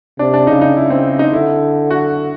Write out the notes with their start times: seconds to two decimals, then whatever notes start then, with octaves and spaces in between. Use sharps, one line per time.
0.19 C3 D4
0.34 D4
0.47 C#3 D#4
0.61 D#4
0.76 C#3 E4
0.90 C4
1.19 D#4
1.33 D3 E4
1.91 F#4